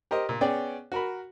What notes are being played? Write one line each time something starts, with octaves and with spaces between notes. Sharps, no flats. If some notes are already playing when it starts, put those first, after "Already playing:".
G4 A#4 C5 D#5
A#2
B3 C#4 G#4 D5 G5
F#4 A#4 B5